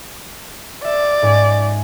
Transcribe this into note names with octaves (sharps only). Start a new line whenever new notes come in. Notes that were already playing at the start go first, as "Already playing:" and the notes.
D5 E5
G#2 C#4